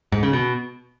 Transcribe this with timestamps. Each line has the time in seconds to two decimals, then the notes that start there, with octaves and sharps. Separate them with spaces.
0.12 G#2
0.23 C#3
0.33 B2